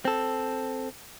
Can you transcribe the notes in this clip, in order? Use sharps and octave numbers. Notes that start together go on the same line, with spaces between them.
C4 A4